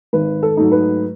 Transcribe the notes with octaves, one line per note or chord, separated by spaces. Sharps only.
G#1 B4
A4
G#2 F#3 A3 D#4
B4